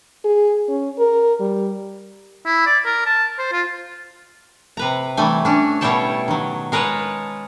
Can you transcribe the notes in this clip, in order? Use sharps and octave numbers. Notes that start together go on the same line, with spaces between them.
G#4
C#4
A#4
G3
E4
D5
A#4
A5
C5
F4
C3 B4 A#5
E3 G3 A3 G#5
C#4 D4
B2 G3 E4 C#5 G5 A5
D#3 F#3
G#3 A#4 B4 C#5 A5